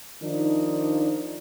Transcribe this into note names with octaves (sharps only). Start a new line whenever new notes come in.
D#3 F3 D4 D#4